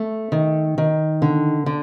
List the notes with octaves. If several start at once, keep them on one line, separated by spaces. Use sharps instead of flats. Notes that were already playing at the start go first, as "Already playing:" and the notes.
Already playing: A3
D#3
D#3
D3
D3